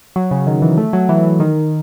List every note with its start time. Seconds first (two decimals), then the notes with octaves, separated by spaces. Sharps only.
0.16 F#3
0.31 C#3
0.47 D#3
0.62 E3
0.78 A3
0.93 F#3
1.09 E3
1.40 D#3